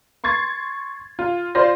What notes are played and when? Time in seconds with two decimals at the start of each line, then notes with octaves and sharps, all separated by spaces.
0.24 C6 C#6 G#6 A6 C7
1.19 F4
1.55 F4 C5 D5 C6 A#6